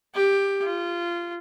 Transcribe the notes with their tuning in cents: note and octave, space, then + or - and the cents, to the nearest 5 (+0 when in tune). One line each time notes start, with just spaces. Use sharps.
G4 +10
F4 -20